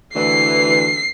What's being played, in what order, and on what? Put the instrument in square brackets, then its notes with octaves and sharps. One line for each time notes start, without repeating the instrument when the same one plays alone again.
[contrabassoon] D2 [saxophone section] E3 [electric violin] C7